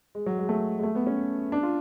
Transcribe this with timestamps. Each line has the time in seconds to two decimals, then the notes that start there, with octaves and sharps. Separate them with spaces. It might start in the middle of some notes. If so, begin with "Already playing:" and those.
0.15 G#3
0.26 F#3
0.38 G#3
0.49 A3
0.79 G#3
0.83 A3
0.95 B3
1.07 C#4
1.52 D4
1.63 F4